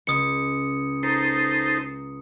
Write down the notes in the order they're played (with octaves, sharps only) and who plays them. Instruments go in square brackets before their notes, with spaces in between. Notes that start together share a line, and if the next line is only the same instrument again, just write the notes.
[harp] C#2 [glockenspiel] D#6 C#7
[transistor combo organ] D#4 A4 C5 [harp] A#5